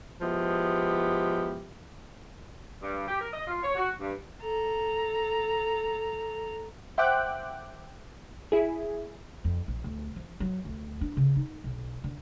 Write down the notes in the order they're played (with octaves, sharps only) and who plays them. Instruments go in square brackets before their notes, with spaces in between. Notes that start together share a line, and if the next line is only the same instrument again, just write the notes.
[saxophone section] F3 G#3 B3 E4 G4
G2
G4
A#4
D#5
F4
C#5
F#4
G2
[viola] A4 A#5
[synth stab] C5 E5 F#5 G5 D6 F#6
E4 G#4
[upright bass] F2
A#1
D2
F3
F#3
D2
D4
C#3
D#4
B1
D3